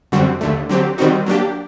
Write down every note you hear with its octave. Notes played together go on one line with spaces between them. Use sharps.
F#2 D3 G3 C4 F#4
D#2 D3 A3
D3 F#3 C4 G4
D#3 G3 C4 D#4 F#4
F#3 A#3 D4 G4